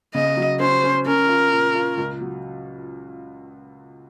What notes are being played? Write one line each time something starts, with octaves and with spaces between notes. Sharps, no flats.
C#3 D#5
F#3
C#4 C5
C#4
C#4 A#4
F4
A#2
F4
C#2
F#3